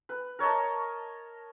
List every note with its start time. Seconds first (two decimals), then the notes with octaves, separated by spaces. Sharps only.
0.09 B4
0.39 A#4 C#5 D#5 A5